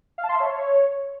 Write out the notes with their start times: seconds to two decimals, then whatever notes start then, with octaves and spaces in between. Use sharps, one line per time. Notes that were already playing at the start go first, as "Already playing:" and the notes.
0.18 F5
0.23 A5
0.29 C6
0.34 E5
0.40 C#5